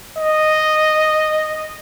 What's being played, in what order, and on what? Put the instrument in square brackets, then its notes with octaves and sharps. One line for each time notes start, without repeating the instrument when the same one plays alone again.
[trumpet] D#5